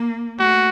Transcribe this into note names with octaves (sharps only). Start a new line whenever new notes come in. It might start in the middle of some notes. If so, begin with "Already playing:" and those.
Already playing: A#3
A3 F#4